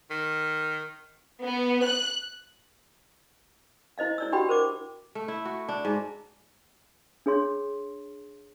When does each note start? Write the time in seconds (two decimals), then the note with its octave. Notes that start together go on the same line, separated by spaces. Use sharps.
0.10 D#3
1.44 B3
1.85 F#6
3.98 E4 C5 D#5 F5
4.18 E4 D5 E6
4.32 D4 F#4 G4 F#5 G5 B5
4.49 A#4 C5 D6
5.15 A3
5.28 E4
5.45 F#4
5.69 D4
5.85 G#2
7.26 D4 G#4 C#5 C6 C#6